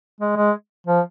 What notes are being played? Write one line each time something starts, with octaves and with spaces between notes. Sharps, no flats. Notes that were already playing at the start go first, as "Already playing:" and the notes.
G#3
G#3
F3